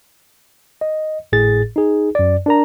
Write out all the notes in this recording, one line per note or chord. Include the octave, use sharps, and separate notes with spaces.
D#5
G#1 A2 G#4 A6
D#4 G#4
F#2 D5
D4 A#4 A#5